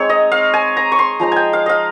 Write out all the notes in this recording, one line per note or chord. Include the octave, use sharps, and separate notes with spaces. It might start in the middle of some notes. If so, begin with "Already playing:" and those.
Already playing: G#3 C4 D#4 C#5
D#5
F5
G#5
A#5
C#6
C6
F3 G#3 D#4 A#5
G5 G#5
F5
D#5 F5